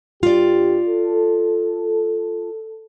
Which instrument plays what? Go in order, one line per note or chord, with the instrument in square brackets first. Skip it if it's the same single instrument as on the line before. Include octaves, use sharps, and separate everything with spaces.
[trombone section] G2 G4 [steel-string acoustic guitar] F4 D5
[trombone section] A4